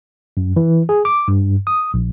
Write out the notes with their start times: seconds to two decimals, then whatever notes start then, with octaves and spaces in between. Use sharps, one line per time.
0.37 F#2
0.56 E3
0.89 G#4
1.05 D6
1.28 G2
1.67 D#6
1.94 A#1